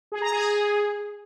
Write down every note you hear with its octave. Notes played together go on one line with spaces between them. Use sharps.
G#4
A#5
G#4